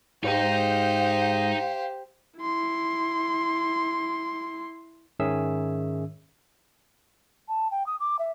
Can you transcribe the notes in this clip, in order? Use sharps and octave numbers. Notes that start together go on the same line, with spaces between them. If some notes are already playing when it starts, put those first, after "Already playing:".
G#2 D#4 G4 C5 D#5 F5
E4 C6
G#2 D#3 C#4 G#4 E5 E6
A5
G5
D#6
D6
E5